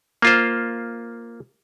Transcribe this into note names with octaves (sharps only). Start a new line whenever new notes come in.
A#3 F4 C5